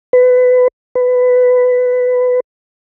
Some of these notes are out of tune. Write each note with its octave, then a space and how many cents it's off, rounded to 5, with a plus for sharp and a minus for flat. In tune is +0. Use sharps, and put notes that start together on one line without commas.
B4 +25
B4 +15